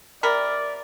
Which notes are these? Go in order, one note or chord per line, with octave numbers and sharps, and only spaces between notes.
C3 A#4 D5 B5